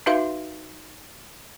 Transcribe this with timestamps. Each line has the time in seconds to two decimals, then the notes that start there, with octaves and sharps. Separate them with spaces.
0.06 D#4 F#4 B4 E5 F5 C6